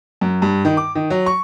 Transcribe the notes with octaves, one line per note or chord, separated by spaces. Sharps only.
F#2
G2
D#3
D6
D#3
F#3
C#6